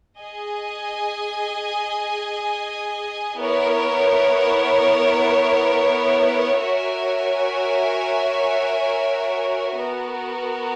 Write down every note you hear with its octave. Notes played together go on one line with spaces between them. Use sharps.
G#4 D#5 G#5
B3 E4 A#4 C#5
F#4 A#4 C#5 E5 G#5
B3 F#4 A#4